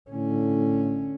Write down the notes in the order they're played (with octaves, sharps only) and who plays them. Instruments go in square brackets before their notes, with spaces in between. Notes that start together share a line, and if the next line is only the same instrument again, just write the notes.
[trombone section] A2 [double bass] D3 C#4